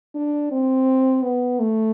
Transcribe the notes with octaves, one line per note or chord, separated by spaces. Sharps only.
D4
C4
B3
A3